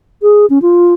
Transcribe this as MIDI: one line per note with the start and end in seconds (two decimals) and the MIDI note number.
0.22 0.46 68
0.50 0.59 61
0.62 0.94 65